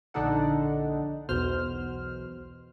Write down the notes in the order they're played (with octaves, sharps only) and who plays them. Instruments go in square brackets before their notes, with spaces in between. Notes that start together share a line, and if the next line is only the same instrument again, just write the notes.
[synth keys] A#1 D3 D4 D#4 A4 F#5
B1 E2 B2 C5 F6